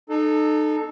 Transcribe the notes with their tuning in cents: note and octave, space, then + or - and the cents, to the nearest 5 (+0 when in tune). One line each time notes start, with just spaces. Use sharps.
D#4 -30 A4 -10